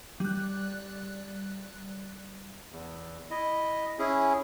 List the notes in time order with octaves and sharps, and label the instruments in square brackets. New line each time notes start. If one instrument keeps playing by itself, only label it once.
[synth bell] G3 F#6
[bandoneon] E2
[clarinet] E4 [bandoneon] D#5
[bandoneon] C#4 E4 G#4